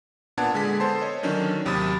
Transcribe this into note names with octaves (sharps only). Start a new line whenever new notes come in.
A#2 B3 D4 F#5 A5 G#6
D3 G#3 G#4 G#5 B6
B3 A4 C5 A5 C6
C#5 D#5
D3 D#3 F#3 C#4 D4
D#2 C3 F#3 B5 D#6 A6